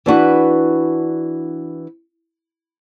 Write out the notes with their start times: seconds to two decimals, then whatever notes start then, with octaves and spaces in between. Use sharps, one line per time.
0.06 E3 D4 F#4 B4